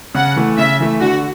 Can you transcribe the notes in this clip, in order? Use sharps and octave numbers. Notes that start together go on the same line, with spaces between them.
C#3 F#5
E3 A3
C#3 E5
E3 A3
D3 F#4